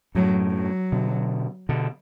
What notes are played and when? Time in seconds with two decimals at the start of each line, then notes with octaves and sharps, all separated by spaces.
0.15 F#2 A2 F#3
0.54 F#3
0.92 B2 D3
1.69 B2 D3